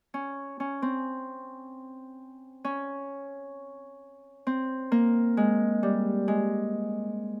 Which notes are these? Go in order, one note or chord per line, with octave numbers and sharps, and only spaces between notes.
C#4
C#4
C4
C#4
C4
A#3
G#3
G3
G#3